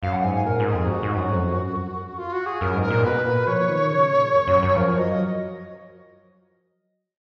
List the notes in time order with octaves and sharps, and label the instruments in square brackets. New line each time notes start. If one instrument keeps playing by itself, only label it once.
[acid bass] F#2 [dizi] F5
[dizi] F#5
[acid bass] G#2 [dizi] G#5
[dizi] G#5
[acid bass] A#2 [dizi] A#4
[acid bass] G#2
[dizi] G#4
[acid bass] F2
[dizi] F#4
[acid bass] G#2
F#2
F2
F#2
[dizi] F4
F#4
G#4
[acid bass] F#2 [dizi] A#4
[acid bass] G#2
[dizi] A#4
[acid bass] A#2
[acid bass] B2 [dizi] B4
[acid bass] A#2
[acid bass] F3 [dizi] C#5
[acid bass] D#3
C#3
A#2
F#2
F#2
F#2
[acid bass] F3 [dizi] A#4
[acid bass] F#3 [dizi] D#5